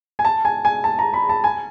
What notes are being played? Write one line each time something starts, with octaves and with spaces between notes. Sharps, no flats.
G#5
A5
G#5
G#5
A5
A#5
B5
A5
G#5